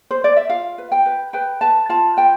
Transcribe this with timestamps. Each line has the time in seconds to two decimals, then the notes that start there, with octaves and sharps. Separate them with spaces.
0.11 C5
0.24 D5
0.37 E5
0.50 F4 F5
0.78 B4
0.92 G5
1.06 B4
1.33 B4 G5
1.61 B4 A5
1.89 F4 A5
2.17 B4 G5